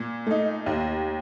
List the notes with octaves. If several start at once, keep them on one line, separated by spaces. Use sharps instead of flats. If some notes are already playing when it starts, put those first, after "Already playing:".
Already playing: A#2
A3 D#4
D#2